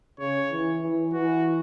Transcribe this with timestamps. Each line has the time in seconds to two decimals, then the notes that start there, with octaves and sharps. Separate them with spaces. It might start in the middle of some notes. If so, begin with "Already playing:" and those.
0.19 C#3 C#5
0.51 E3
0.82 E3
1.13 E3 F#4